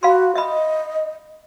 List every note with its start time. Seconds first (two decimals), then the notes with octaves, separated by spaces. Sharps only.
0.03 F#4 F5 B5 C6
0.35 D#5 E5 B5